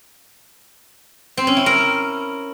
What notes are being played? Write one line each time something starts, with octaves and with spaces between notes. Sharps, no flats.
C4
C#4
E4
A#4